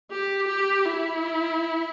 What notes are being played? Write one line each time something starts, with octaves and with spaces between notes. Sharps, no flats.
G4
G4
E4